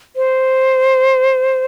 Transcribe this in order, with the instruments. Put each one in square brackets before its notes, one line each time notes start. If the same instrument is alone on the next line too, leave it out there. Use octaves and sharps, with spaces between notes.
[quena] C5